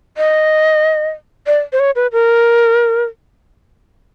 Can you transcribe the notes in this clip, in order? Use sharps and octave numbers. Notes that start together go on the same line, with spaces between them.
D#5
D5
C5
C#5
B4
A#4